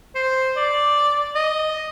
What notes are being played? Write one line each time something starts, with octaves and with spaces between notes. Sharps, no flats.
C5
D5
D#5